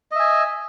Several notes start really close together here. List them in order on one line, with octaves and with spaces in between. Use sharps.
D#5 E5 G#5